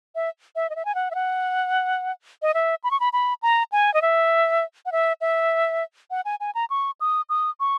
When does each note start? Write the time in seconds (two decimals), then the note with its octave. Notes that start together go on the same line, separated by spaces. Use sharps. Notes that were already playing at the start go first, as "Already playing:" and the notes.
0.15 E5
0.56 E5
0.70 D#5
0.76 E5
0.85 G#5
0.95 F#5
1.11 E5
1.15 F#5
2.42 D#5
2.54 E5
2.84 B5
2.91 C#6
3.00 B5
3.13 B5
3.42 A#5
3.72 G#5
3.94 D#5
4.02 E5
4.86 F#5
4.92 E5
5.21 E5
6.11 F#5
6.25 G#5
6.40 G#5
6.55 A#5
6.70 C#6
7.01 D#6
7.29 D#6
7.60 C#6